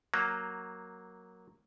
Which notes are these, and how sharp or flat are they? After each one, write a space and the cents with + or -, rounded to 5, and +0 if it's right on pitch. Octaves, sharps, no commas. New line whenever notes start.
F#3 +0 A#3 +0